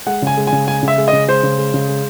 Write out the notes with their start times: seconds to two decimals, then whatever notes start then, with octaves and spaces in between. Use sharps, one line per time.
0.07 G#3 F#5
0.22 C#3 G#5
0.37 G#3
0.47 G#5
0.52 C#3
0.67 G#3 G#5
0.83 C#3
0.88 E5
0.98 G#3
1.08 D#5
1.13 C#3
1.28 G#3 C5
1.43 C#3
1.58 G#3
1.74 C#3
1.89 G#3